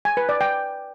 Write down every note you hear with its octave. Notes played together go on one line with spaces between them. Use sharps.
G#5
B4
D5
G5